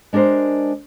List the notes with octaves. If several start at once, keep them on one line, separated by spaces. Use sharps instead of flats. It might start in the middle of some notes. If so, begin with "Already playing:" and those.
G#3 D4 G4 A#4 C5